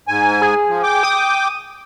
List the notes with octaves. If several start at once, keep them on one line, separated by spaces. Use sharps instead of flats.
G#2 G#5
G#4
F3
G5 D6
D#6